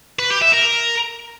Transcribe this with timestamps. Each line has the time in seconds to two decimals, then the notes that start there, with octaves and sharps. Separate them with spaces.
0.19 B4
0.30 G4
0.42 E5
0.53 A#4